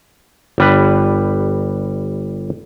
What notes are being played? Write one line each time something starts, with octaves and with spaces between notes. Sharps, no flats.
G1 G3 B4